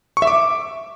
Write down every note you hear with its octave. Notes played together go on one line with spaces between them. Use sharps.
C#6
E5
D6